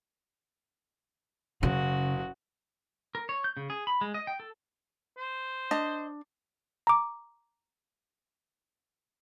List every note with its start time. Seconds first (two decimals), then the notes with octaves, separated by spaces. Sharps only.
1.63 F#1 C#3 F#4
3.15 A#4
3.29 C#5
3.44 G6
3.57 C#3
3.70 G#4
3.87 B5
4.01 G#3
4.14 D#5
4.27 G5
4.40 A4
5.17 C5
5.71 D4 D#5
6.87 A#5 D6